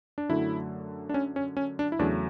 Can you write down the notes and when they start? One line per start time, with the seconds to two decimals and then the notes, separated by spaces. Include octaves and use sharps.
0.18 D4
0.29 F#2 D3 F#3 A3 E4
1.09 D4
1.14 C#4
1.36 C#4
1.57 C#4
1.79 D4
1.92 E4
1.99 E2 C#3 F#3 A3 D4